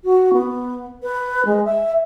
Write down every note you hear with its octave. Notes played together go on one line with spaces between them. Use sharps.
F#4
B3
B4
G#3
E5